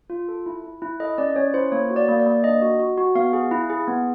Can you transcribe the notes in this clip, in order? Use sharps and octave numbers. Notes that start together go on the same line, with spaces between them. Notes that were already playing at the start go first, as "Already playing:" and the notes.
F4
A4
E4
E4
E4
A4 D#5
C#4 D5
C#4 C#5
E4 C5
A#3 C#5
F#4
D5
A#3
D5
A#3
D4 D#5
F#4
F#4
F#4
B3 F5
G#4
E4
G#4
B3